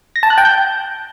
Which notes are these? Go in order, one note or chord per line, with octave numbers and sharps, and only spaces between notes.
A#6
A5
F#6
G5
G6